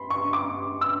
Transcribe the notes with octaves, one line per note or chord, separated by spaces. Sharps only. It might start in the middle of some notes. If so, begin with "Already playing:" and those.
Already playing: B5 C6
C#6
D6
E6